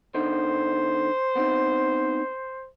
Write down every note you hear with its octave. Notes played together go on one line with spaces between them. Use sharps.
D3 B3 D#4 C5
B3 C4 D#4